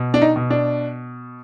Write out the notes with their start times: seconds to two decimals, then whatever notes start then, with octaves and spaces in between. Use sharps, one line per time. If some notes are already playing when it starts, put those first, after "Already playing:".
Already playing: B2
0.14 D4
0.21 D#4
0.36 B2
0.50 D4